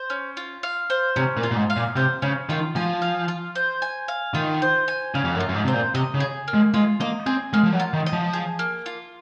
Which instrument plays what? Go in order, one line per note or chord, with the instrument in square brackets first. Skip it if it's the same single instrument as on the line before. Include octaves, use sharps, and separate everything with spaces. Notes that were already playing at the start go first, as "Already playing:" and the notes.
Already playing: [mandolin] C5
C#4
F4
F5
C5
[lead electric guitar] C3 [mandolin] C#4
[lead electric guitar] A#2
[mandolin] F4
[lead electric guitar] A#2
G#2
[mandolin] F5
[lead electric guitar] A#2
[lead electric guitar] C3 [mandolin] C5
[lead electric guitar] C#3 [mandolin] C#4
[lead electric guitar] D#3 [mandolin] F4
[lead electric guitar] F3 [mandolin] G#5
[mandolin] F5
F4
C5
G#5
F5
[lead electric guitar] D#3 [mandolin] F4
[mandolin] C5
G#5
[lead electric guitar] C#3 [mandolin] F5
[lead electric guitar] F2
F#2
[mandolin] F4
[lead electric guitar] F#2
G#2
[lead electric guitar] C3 [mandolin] C5
[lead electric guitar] A#2
[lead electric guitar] C3 [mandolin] D#5
[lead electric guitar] C#3
[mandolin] G#4
A#3
[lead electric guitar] G#3
[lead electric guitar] G#3 [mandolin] F4
[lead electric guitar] A#3 [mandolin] D#5
[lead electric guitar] C4 [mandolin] G#4
[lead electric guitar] G#3 [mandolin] A#3
[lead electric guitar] F3
F#3
[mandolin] F4
[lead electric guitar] D#3
[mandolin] D#5
[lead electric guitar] F3
[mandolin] G#4
A#3
F4